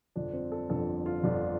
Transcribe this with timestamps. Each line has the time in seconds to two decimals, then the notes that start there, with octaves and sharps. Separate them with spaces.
0.16 G1 F2 D3 F3 D4
0.33 C4
0.52 A4
0.70 G1 F2 D3 F3 A4
1.06 F4
1.23 G1 F2 D3 F3 D4